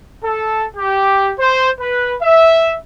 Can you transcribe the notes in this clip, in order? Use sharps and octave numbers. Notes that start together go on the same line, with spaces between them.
A4
G4
C5
B4
E5